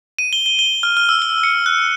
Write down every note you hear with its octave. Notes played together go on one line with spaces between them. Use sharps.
D#7
G7
G7
G7
F6
F6
E6
G7
C#7
F#6